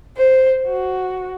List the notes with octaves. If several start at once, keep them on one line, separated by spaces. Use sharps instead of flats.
C5
F#4